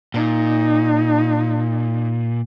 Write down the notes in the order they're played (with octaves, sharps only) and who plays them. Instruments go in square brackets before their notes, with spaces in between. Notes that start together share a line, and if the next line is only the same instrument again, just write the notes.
[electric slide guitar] A#2 [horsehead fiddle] D#4